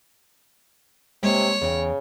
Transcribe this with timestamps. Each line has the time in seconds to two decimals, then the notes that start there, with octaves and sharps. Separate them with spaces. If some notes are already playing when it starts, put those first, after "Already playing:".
1.23 C3 G#3 A#3 C#5
1.61 E2 C#3 G5